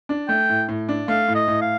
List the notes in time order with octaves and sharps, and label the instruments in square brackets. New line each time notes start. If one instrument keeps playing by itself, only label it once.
[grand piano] D4
[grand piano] A3 [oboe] G5
[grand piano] A2
A2
D4
[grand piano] A3 [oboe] F5
[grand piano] A2
[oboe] D#5
[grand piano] A2
[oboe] F5